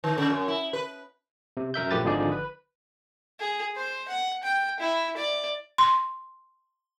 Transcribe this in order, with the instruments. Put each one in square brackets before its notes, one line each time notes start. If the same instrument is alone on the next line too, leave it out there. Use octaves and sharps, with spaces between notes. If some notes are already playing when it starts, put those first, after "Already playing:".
[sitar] D#3
C#3
F#2
E4
B4
[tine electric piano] C3
F#2 A#4 E5 G6
A#1 F3 A3 G4 B4 A6
G#1 D3 F3 D#4 G#4 D5
B4
[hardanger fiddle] G#4
C5
F#5
G5
E4
D5
[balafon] C6